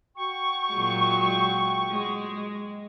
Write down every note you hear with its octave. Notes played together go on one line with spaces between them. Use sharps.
F#4 G5 C#6
A#2 F#3 G#3
G#3